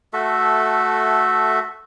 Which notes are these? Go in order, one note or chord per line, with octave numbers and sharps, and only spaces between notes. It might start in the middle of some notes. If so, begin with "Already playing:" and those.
A3 F#4 A4 E5